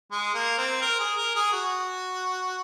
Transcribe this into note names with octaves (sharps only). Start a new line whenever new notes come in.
G#3
A#3
C4
A#4
G#4
A#4
G#4
F#4